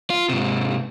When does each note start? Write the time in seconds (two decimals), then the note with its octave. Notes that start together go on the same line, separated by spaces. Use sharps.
0.10 F4
0.29 G#2 C3